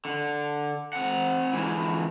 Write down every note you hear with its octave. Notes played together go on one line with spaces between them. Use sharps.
D3
C4 F#5
G#2 E3